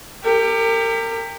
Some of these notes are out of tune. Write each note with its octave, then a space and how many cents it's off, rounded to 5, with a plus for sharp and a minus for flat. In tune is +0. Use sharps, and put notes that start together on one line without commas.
G4 +25 A#4 -35